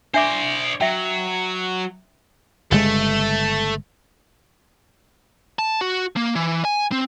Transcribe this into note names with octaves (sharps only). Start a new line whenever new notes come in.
D4 C5 D5 E5 D6
F#3 E5 G5
G1 C#3 G#3 A3
A5
F#4
A#3
E3
G#5
C4